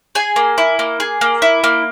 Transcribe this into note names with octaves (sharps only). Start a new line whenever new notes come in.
G#4 G#5
A#3
E4
A#3
G#4
A#3
E4
A#3